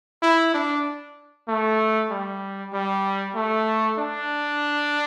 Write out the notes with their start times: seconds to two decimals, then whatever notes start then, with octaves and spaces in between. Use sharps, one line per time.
0.22 E4
0.54 D4
1.48 A3
2.11 G3
2.73 G3
3.36 A3
3.98 D4